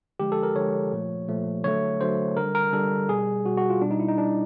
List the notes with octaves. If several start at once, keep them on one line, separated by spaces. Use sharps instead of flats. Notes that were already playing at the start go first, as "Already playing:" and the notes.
D3 F3 G#3 G4
A4
A#4
D3 F3 G#3 C#5
A#2 F3 A3
A#2 F3 A3
D3 F#3 A3 C#5
D3 F#3 A3 C5
D3 G3 A#4
A#4
D3 G3 A4
B2 G3 G#4
B2 G3 F#4
F#4
F4
B2 G3 D4
D#4
E4
D#4
B2 G3 D4